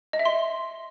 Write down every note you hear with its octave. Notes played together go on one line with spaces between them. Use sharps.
D#5
E5
C6